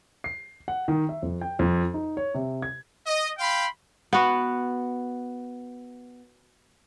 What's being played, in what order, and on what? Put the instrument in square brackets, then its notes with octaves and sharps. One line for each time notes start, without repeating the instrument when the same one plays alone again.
[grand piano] C7
F#5
D#3
E5
F2
G5
F2
D#4
C#5
C3
G#6
[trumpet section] D#5
F5 G5 B5 C6
[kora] B3 F#4